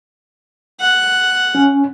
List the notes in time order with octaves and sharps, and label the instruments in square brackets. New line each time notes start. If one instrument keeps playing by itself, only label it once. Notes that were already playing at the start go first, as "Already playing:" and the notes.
[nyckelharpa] F#5
[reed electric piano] C#4